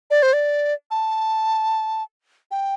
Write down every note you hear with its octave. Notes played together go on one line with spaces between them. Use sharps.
D5
C5
D5
A5
G5